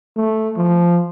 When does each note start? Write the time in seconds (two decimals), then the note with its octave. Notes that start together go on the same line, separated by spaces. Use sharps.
0.17 A3
0.57 F3